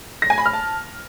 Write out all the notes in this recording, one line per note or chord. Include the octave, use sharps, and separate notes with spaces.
A#6
G#5
B5
F6
A5